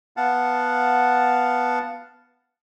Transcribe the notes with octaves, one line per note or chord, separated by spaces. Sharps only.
B3 F5 F#5 A5